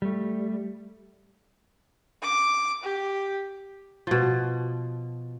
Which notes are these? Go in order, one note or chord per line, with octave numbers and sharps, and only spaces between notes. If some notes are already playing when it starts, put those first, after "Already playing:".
G3 A3
D6
G4
B2 F3